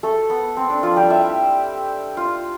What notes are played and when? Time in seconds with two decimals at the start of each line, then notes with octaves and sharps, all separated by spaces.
0.03 A3 A4
0.30 B3
0.57 C4
0.70 D4
0.83 F3 F4
0.96 G3 G4
1.10 E4 E5
2.17 F4 F5